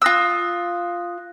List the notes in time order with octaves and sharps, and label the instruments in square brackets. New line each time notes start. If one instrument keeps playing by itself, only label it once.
[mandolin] F4 E6 [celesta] D#6 F#6 A#6